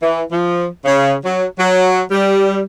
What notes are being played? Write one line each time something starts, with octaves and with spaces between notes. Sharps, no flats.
E3
F3
C#3
F#3
F#3
G3